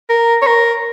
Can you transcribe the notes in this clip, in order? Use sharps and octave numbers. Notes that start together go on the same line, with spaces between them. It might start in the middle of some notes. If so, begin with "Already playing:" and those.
A#4
C#5
A#4